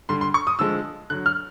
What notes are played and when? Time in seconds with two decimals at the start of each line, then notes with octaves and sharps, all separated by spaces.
0.09 D3 G3 C6
0.21 C6
0.34 C#6
0.47 D#6
0.59 D3 F3 G#3 E6
1.10 D3 F#3 F#6
1.26 F6